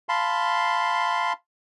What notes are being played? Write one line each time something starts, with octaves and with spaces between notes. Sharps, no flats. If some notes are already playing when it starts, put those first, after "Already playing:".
F5 A5 B5 C6